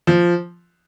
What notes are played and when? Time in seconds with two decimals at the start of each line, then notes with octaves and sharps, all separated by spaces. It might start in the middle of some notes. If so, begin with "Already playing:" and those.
0.07 F3